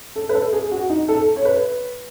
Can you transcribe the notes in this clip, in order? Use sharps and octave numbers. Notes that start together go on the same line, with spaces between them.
A4
B4
A4
G#4
F#4
D#4
A4
C#5
B4